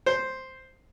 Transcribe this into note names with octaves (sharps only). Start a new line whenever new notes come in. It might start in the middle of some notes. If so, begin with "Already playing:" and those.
C5